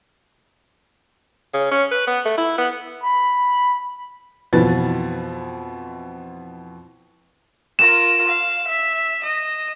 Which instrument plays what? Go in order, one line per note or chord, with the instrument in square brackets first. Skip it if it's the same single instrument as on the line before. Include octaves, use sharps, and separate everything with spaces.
[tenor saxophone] C#3
C#4
B4
B3
A3
E4
B3
[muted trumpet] B5
[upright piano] F2 B2 E3 B3 B4 A6
[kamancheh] F4 A#4 [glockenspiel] E7
[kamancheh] F5
E5
D#5